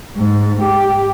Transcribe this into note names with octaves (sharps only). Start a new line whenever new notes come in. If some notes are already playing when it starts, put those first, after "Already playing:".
G#2
G4